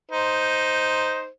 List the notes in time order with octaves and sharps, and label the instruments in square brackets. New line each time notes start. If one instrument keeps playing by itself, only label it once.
[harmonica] D#4 C5